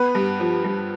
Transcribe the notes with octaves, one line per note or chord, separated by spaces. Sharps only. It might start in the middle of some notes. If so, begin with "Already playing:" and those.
Already playing: B3 B4
G2
F3
G2